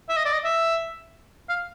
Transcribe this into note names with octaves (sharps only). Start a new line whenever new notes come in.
E5
D#5
D5
D#5
E5
F5